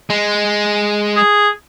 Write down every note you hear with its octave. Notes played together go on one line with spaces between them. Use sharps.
G#3
G#4